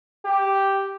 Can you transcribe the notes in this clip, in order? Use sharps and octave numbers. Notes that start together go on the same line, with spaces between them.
G4